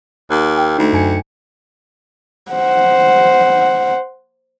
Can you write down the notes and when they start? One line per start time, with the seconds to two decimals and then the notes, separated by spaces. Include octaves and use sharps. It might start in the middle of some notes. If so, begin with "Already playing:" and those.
0.30 D#2
0.57 G5
0.78 D2 A3 D#4
0.93 F#2 G#5 C#7
2.52 C5 F#5